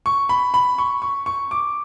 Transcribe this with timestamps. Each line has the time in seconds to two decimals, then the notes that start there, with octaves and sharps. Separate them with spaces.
0.06 C#6
0.29 B5
0.54 B5
0.78 C#6
1.02 C#6
1.26 C#6
1.51 D6